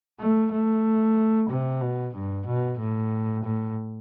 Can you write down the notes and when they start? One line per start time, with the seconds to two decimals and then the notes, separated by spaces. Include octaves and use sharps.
0.20 A3
0.52 A3
1.49 C3
1.81 B2
2.14 G2
2.46 B2
2.79 A2
3.44 A2